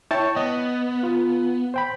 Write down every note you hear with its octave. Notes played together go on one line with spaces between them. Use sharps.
E4 C#5 G5 A5 C#6
B3 D#5
F4
C5 G5 B5